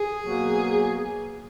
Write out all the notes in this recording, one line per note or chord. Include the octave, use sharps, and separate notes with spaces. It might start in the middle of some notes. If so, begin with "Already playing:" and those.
Already playing: G#4
B2 F#3 A#3